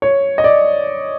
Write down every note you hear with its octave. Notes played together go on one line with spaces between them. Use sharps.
C#5
D#5
D5